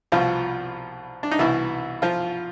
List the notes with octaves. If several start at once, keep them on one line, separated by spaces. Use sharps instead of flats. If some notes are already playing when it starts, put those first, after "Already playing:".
C2 B2 F3 F4
D4
D#4
C2 B2 E3 E4
F3 F4